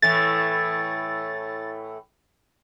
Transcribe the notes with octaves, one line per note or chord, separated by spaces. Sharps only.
A2 E3 A3 A6